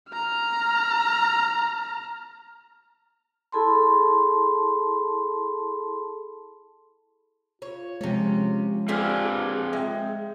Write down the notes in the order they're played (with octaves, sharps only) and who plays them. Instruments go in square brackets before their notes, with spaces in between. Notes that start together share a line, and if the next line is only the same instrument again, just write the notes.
[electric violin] A#5 F6
[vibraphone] E4 G#4 A4 A5 B5 C6
[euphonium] F4 [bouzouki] C#5
[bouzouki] C3 C#4 [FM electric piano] F3 G#3
[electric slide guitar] C4 B4 F5 [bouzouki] D4 G4 G#4
[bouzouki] G#3 [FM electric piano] E5 G5